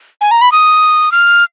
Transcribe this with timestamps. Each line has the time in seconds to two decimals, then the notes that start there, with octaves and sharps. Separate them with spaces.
0.21 G#5
0.31 A#5
0.41 B5
0.52 D#6
1.12 F6